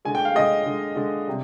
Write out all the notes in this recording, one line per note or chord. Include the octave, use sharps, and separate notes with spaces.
D3 G#3 G#5
G5
F5
D3 G#3 D#5
D3 G#3
D3 G#3
C3 G3